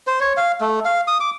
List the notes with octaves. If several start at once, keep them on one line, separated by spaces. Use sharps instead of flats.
C5
C#5
F5
A3
F5
D#6
D6